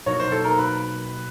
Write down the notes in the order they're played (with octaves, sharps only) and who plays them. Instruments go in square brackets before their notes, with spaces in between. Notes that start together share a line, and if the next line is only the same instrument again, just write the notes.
[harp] B2 F#3 A#3 D#4 F#4 [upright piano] C#5
[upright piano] C5
A4
A#4
B4